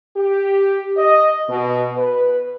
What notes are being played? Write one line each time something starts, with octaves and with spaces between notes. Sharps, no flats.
G4
D#5
B2
B4